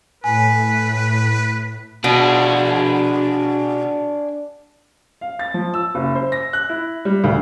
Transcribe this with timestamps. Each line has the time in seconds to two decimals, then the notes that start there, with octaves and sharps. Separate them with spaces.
0.24 A2 B4 G#5
2.04 B2 D4 G#4
5.21 F5
5.39 A6
5.54 F3
5.74 E6
5.95 F#1
6.15 C5
6.32 A#6
6.53 F#6
6.69 E4
7.05 G3
7.24 D2